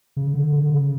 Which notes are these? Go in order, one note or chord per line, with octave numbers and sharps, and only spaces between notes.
C#3
D3
D3
C#3